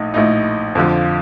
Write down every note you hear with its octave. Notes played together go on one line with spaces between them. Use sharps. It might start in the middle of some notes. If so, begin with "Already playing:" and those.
Already playing: A#1 A2 A3 D#4
A#1 A2 A3 D#4
F2 D3 F3